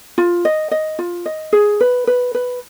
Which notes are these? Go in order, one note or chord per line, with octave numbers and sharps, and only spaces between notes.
F4
D#5
D#5
F4
D#5
G#4
B4
B4
B4